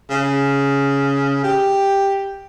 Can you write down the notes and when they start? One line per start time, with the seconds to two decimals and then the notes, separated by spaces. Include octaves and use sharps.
0.10 C#3
1.43 G4